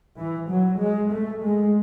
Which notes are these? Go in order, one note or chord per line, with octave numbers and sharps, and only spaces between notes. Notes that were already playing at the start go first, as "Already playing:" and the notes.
E3
F#3
G#3
A3
G#3